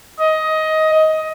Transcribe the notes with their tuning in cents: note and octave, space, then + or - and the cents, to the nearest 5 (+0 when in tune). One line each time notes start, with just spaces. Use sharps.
D#5 +15